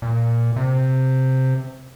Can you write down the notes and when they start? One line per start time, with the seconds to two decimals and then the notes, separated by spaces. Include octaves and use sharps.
0.02 A#2
0.56 C3